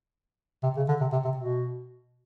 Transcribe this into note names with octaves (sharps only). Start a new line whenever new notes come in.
C3
C#3
D3
C3
C3
C3
B2